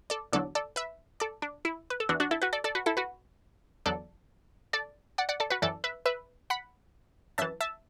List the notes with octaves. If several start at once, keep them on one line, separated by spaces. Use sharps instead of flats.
A4 D5
E2 D3 F#3 A4 D5
A4 D5
B4 E5
A4 D5
D4
E4
B4
A4
E2 E3 D4 F#4
D4 F#4
E4 A4
F#4 B4
A4 D5
A4 D5
F#4 B4
E4 A4
F#4 B4
E2 D3 F#3 A4 D5
A4 D5
D5 F#5
D5 F#5
A4 D5
F#4 B4
F#2 E3 A4 D5
B4 E5
B4 E5
F#5 B5
F#2 E3 E5 A5
E5 A5